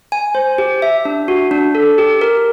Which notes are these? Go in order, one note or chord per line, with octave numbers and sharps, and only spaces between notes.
G#5
C5
G4
E5
D4
F#4
D4
A4
G4
A#4